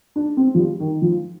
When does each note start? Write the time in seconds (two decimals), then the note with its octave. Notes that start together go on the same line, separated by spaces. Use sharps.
0.16 D4
0.37 C4
0.55 F3
0.58 G3
0.80 D#3
1.02 F3